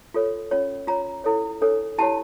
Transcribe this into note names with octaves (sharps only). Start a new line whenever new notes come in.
F4 A4 C#5
C#4 F4 C#5
F4 C#5 A#5
E4 A4 C#5
D4 A4 C#5
E4 G4 C#5 A5